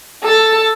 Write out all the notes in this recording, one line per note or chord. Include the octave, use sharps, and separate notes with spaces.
A4